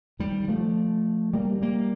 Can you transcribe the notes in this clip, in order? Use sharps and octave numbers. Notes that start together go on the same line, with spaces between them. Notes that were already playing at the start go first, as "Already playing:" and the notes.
D#3 G3
F3 A3
G3 A#3
G3 A#3